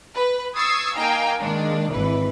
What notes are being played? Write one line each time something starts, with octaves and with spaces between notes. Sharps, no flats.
B4
C#6 D#6 E6 G#6 A6 C7
A#3 D#4 F5 G5 G#5 A#5
D#3 G#3 A#3 D4
G#1 E3 B4